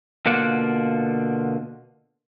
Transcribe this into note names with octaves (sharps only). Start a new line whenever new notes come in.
B2 D3 A#3 F4 D5 F#5